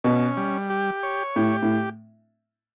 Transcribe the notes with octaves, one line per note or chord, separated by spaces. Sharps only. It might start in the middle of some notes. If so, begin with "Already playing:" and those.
B2 C#4
G3
G4
C#5
A2 G4
A2